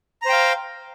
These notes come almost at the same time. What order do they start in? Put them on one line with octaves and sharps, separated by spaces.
A#5 C5 G5 F5